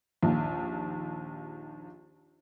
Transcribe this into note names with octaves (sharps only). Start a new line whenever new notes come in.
A#1 D#2